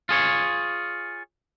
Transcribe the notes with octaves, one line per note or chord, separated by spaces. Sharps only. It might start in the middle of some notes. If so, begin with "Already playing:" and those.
F4 G#4 C#5